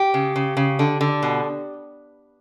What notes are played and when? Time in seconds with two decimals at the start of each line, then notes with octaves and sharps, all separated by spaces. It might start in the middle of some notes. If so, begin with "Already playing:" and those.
Already playing: G4
0.14 C#3
0.36 C#3
0.57 C#3
0.79 D3
1.01 D3
1.23 B2